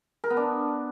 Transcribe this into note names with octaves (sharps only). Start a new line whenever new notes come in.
A#4
B3
D4